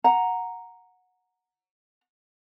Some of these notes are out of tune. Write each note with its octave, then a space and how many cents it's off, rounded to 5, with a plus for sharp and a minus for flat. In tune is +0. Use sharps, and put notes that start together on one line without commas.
F#5 -10 A#5 +0